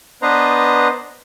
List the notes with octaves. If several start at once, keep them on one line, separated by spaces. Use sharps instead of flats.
B3 D4 B4 C5 D#5 A#5